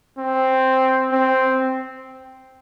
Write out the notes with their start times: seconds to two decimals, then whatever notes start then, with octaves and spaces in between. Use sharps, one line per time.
0.18 C4
1.12 C4